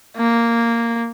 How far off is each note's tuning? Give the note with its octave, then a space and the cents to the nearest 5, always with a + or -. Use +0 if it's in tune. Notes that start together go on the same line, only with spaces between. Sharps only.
A#3 -5